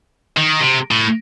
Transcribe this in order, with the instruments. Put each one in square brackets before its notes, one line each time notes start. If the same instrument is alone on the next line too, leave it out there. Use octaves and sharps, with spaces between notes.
[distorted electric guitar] D#3
C3
A2